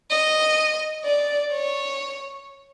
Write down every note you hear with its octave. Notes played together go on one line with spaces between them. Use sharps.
D#5
D5
C#5